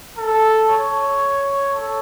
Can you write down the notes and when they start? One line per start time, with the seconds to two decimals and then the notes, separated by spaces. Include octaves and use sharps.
0.18 A4
0.69 C#5
1.72 A4